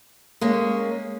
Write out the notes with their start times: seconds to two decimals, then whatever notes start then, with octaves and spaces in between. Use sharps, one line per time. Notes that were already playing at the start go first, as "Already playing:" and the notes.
0.41 G#3 A#3 C#4